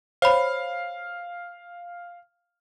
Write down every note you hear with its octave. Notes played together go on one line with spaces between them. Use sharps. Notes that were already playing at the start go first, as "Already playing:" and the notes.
C5 C#5 F5 B5